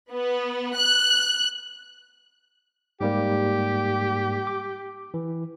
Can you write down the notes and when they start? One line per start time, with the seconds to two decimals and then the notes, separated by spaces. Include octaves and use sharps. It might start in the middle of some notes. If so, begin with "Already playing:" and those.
0.13 B3
0.76 F#6
3.01 G#2 G3 A#3 G4
4.47 D6
5.14 E3